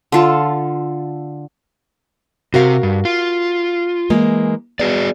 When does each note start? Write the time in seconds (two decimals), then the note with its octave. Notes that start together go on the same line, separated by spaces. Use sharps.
0.12 D3 F4 A4
2.54 C3 F#4 A#4 F5
2.83 G2
3.05 F4
4.10 E3 G#3 A#3
4.79 B3 F#4 G#4 D5